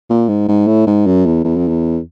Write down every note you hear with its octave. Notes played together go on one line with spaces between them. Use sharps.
A#2
G#2
G#2
A2
G#2
F#2
E2
E2
F2
E2